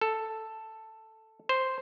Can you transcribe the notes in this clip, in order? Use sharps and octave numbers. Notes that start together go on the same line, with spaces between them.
A4
C5